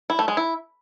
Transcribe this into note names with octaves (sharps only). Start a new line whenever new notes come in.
E4
A3
G#3
E4